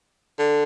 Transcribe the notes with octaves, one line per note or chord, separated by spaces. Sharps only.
D3